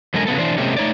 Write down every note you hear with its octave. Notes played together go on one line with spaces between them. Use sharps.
F#2 D3 G#3 A4 A#4 G#5
C#3 F#3 B3 A4
E3 D4 C5
C3 G#3 A#3 C#4 G4 A4
A3 D#4 C#5 D5